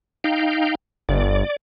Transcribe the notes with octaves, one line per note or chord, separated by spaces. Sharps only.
D#4 F5 G5
G1 D5